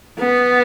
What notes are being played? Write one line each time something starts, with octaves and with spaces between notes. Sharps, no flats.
B3